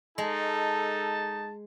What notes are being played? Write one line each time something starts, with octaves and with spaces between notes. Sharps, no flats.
G#3 D#4 A4 A5